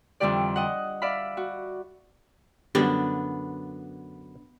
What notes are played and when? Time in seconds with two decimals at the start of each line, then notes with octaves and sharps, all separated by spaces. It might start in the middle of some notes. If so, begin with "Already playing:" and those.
0.20 F2 D3 E3 G3 G4 D5
0.56 D#5 F#5
1.02 D5 E5 F5 B5
1.37 F#4
2.75 F#2 D3 G3 B3 D4 G4